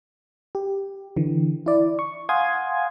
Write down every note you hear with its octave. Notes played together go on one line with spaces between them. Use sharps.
G4
D3 E3
E4 D5
C#6
F5 F#5 G#5 C6 D#6 G#6